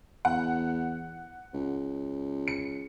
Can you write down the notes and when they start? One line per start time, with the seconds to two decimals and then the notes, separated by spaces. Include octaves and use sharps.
0.25 E2 F#5
1.54 C#2
2.48 C#7